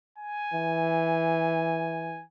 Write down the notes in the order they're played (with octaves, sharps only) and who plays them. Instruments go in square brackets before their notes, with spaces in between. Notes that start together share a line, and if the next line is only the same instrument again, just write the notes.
[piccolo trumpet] G#5
[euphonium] E3